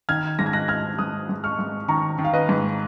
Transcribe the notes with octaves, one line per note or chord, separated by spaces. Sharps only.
D#3 F6 G#6
G#2 A#6
G#6
F#6 A#6
G#2 F6 G#6
G#2 D#6 F#6
G#2
C#6 F6
G#2
D#3 A#5 C#6
D#3
F5
B4 D#5
G#2